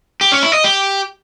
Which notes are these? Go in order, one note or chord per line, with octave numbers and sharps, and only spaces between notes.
G4
C#4
E4
D#5
G4